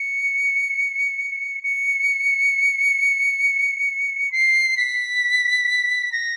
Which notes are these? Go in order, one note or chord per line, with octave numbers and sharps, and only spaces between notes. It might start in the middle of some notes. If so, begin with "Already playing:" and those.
Already playing: C#7
C#7
C7
B6
A#6